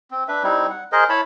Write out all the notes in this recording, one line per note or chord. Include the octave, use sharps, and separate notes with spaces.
C4
D4 B4 E5
G3 C4 D#4 E4
F#5
G#4 A#4 C5 D#5
E4 C#5 A5 B5